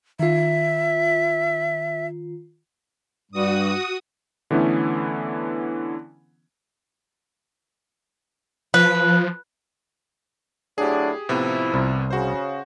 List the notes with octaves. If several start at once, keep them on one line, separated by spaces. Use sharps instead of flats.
D#3 F4 E5
G2 G3 F#4 D#6
D3 E3 A3 B3 C#4 E4
F3 B4
A2 F#3 D4 G4 G#4
A2 C3 F3 B3 E4
C2
C#3 F#4 C5